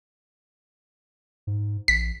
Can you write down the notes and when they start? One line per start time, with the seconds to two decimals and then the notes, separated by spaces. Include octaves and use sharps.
1.47 G#2
1.88 A#1 B6